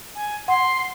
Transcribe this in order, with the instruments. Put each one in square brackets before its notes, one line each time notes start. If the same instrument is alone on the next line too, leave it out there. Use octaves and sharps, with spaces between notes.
[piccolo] G#5
[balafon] F#5 [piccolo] C6